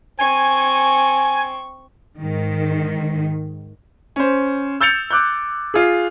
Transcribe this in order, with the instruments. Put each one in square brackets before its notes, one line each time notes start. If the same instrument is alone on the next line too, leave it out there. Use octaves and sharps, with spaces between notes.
[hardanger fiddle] C4 C#6 [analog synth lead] G#5
[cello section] G#2 D#3
[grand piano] C#4 C5
E6 G6 A6 C#7 F7
D6 F#6 G6
F4 G#4